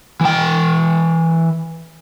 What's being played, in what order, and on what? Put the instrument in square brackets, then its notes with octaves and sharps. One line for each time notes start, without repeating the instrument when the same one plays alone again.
[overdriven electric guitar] E3 G5